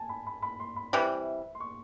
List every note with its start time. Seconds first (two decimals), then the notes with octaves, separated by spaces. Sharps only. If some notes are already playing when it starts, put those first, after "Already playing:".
Already playing: G#5 A5
0.09 B5
0.26 B5
0.42 B5
0.60 C6
0.76 B5
0.93 C3 E3 G3
1.55 C6
1.60 C#6